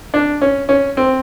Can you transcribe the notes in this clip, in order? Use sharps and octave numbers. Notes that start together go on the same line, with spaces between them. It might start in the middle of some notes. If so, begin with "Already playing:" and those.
D4
C#4
C#4
C4